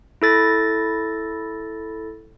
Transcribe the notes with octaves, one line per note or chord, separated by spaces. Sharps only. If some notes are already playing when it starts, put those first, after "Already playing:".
E4 A4 A6 A#6